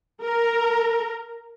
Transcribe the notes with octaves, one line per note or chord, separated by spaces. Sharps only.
A#4